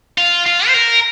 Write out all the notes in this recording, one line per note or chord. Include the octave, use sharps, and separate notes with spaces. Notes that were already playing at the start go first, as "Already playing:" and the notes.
F4
F4
C5
A#4